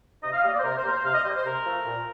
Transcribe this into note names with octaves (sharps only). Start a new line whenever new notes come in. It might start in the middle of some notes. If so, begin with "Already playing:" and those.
C3 D#5
F5
G3 A#3 D#5
D5
C5
C3 A#4
C5
G3 A#3 A#4
C5
C3 F5
D#5
G3 A#3 C5
C5
C3 A#4
F3 A3
A#2